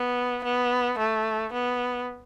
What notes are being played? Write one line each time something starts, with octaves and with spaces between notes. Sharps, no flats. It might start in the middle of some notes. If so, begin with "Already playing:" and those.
Already playing: B3
B3
A3
B3